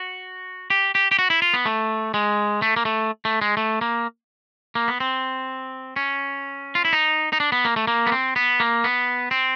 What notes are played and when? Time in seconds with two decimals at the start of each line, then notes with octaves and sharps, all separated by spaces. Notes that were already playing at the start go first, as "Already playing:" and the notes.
Already playing: F#4
0.70 G4
0.95 G4
1.11 G4
1.19 F#4
1.30 E4
1.42 F4
1.54 B3
1.66 A3
2.14 G#3
2.62 A3
2.76 A#3
2.85 A3
3.25 A3
3.42 G#3
3.57 A3
3.81 A#3
4.75 A#3
4.88 B3
5.00 C4
5.96 C#4
6.75 F4
6.85 E4
6.93 D#4
7.33 D#4
7.40 D4
7.52 B3
7.65 A#3
7.76 A3
7.87 A#3
8.07 B3
8.12 C4
8.36 B3
8.60 A#3
8.84 B3
9.31 C4